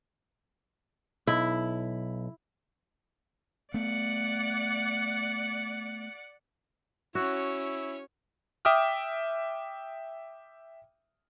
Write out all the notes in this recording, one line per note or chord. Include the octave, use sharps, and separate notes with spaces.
B1 E4
A3 B3 D5 F#5
C#4 E4 F#4 C#5
E5 G5 D6 D#6 F6